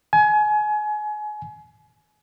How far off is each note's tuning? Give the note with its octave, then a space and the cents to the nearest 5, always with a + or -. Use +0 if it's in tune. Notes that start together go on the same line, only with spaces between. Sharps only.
G#5 +30